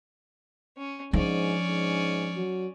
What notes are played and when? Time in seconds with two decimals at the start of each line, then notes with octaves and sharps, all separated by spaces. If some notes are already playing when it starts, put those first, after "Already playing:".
0.77 C#4
1.13 G#2 F3 C#4 D4 D5
1.68 G#2
2.36 F#3